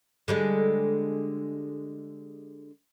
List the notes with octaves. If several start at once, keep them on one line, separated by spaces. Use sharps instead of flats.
D3 G3 G#3